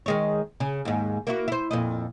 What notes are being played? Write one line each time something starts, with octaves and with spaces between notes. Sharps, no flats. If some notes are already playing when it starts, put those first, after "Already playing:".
D#3 G#3 C#5
C#3
D#2 G#2
A#3 E4 F#4
E4 C5
F2 A#2 D#5